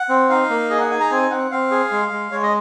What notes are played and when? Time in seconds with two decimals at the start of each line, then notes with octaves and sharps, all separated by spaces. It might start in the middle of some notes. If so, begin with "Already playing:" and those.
Already playing: F#5
0.09 C4
0.30 D#4 F5
0.50 A#3
0.70 G#4 D#5
0.80 F#5
0.90 D#4 G#5
1.00 A#5
1.10 C4 G#5
1.31 C4 F#5
1.51 C4 F5
1.71 G#4
1.91 G#3
2.12 G#3
2.31 G#3 C#5
2.43 D#5